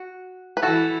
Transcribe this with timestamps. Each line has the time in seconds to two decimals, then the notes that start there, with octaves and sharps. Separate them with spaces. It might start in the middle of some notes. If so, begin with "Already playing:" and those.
Already playing: F#4
0.57 B4
0.63 E3 E4 F#4 A4